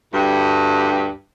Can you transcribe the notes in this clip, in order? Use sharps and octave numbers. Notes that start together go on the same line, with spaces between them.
D2 G2